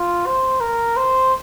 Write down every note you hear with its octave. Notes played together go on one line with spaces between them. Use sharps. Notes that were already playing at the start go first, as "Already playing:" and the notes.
Already playing: F4
C5
A#4
C5